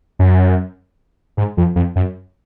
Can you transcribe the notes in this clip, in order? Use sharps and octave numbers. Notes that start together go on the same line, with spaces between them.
F#2
G#2
F2
F2
F#2